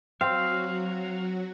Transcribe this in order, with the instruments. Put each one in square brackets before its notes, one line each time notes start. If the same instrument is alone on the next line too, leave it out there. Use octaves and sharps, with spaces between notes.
[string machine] F#3 F#4 [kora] C4 [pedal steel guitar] F5